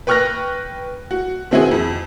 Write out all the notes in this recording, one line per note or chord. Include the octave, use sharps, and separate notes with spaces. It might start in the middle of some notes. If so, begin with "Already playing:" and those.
B4 G5 C#6 F6 F#6 A#6
F#4
B2 D#3 C4 E4 F#4 G#4
F2